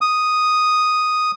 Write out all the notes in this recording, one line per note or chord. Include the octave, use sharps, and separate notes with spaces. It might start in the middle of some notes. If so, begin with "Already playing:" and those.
D#6